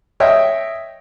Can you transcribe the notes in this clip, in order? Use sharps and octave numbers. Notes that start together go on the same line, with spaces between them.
C#5 D#5 E5 G5